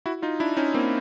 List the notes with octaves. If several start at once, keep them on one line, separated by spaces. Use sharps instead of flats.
E4 F#4
D#4 F4
D4 E4
C#4 D#4
A#3 C4